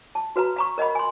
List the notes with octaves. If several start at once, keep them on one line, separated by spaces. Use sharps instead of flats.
A5
F#4 B4 F5 A#5
F5 A#5 C#6
A#4 D#5 F#5 B5
G#5 C6